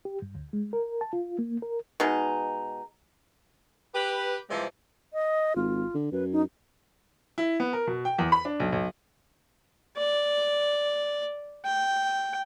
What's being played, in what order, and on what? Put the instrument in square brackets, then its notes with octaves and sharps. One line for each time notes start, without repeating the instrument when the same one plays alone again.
[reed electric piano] G4
G2
D2
G#3
A#4
A5
F4
A#3
A#4
[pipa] B2 G#3 D#4
[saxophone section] G4 B4
C3 E3 F3 G3 G#3
[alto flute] D#5
[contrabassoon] G#1 [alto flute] F4
[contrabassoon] D3
[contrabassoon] F#2 [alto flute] B4
[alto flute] D#4
[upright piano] E4
B3
A#4
B2
G5
E2
B5
D4
B1
B1
[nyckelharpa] D5
G5